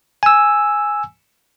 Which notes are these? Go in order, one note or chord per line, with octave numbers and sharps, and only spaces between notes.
G#5 E6